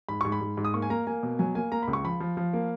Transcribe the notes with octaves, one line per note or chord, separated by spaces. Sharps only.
G#2 B5
G#2 C#6
B5
G#2
G#2
D#6
A#3 C#6
G#5
A#3 A#5
A#3 G#5
B2
F#3 G#5
A#3 G#5
A#3 A#5
C#2 B5
C#6
F3 B5
F3
F3
A#3